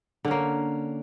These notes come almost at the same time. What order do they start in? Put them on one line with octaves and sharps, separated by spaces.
D3 C#4 A#3